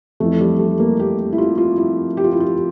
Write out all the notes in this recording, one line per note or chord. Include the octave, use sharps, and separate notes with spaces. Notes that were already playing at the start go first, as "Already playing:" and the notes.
F2 E3 A3
G3
A3
A#3
G4
E4
F4
F4
E4
G4
F4
E4
F4